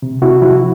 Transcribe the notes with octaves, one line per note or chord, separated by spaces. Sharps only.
C3
C3 E4 F#4
F3 E4 F#4